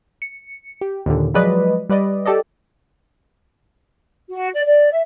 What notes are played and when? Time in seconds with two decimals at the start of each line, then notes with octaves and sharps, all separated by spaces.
0.22 C#7
0.81 G4
1.06 D#2 A#2 D3
1.34 F3 F#3 G#3 B4 D5 D#5
1.89 G3 B4 D5 D#5
2.26 G4 A4 D5 D#5
4.30 F#4
4.53 D5
4.65 D5
4.92 E5